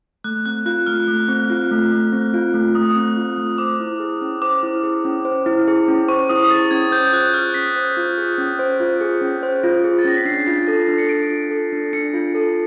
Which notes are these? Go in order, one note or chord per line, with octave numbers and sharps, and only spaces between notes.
A3 F#6
C4 F#6
F4 F#6
A3 F6
A3
C4
F4
A3
A3
C4
F4
A3
A3 D#6
C4
F4
A3
C5 D6
E4
G#4
C#4
C5 D6
E4
G#4
C#4
C5
E4
G#4
C#4
C5 C#6
E4 D#6
G#4 A6
C#4 G#6
C5 G6
F4 F#6
G#4 F6
C#4 B6
C5
F4
G#4
C#4
C5
F4
G#4
C#4
C5
F4
G#4
A6
C#4 A#6
B6
D4 C7
F4
A4
D4
C#7
D4 D7
F4
A4
D4
D4 C#7
F4
A4